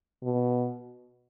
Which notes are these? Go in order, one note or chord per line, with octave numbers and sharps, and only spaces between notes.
B2